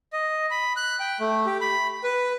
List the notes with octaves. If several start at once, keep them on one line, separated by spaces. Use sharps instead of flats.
D#5
B5
F#6
G5
A3
G4
B5
B4